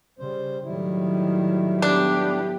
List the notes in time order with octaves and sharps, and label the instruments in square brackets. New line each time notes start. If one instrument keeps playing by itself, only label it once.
[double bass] C#3 [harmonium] G3 C5
[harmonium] A2 G3 E4 [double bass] D#3 F#3
[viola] B3 G4 [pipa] D4